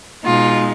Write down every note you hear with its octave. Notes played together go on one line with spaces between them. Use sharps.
B2 G#3 D#4 F4